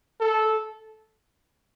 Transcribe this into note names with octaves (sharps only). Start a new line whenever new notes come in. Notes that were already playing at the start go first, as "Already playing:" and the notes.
A4